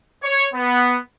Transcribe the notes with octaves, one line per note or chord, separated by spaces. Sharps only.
C#5
B3